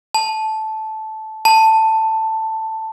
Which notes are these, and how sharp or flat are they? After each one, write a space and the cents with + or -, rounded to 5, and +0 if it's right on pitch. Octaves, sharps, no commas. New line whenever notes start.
A5 -10
A5 +10